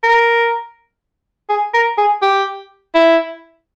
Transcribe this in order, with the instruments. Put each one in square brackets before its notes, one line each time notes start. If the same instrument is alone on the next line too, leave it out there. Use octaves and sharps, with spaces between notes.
[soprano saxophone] A#4
G#4
A#4
G#4
G4
E4